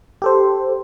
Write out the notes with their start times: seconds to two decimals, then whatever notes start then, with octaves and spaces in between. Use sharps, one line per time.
0.22 G4 A4 C5